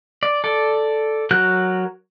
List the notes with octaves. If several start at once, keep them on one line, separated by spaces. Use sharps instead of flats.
D5
A4 D5
F#3 F#4 A#4 F#6 G6